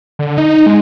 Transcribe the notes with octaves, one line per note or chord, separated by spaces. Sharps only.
D3
D#4
G#3